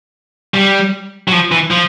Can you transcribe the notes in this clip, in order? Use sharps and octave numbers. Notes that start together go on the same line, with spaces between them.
G3
F#3
F3
E3
F3